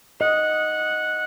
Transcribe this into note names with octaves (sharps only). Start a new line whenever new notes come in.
D#5 F#5